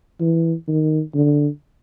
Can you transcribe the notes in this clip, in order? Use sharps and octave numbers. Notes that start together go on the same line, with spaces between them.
E3
D#3
D3